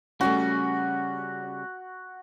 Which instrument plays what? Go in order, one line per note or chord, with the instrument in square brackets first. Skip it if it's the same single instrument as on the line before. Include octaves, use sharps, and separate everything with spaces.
[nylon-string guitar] C#3 G3 A3 [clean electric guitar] C#4 [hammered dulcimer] F#4